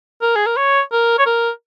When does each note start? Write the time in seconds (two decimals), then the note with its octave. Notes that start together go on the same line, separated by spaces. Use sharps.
0.22 A#4
0.36 G#4
0.46 A#4
0.57 C#5
0.92 A#4
1.19 C#5
1.26 A#4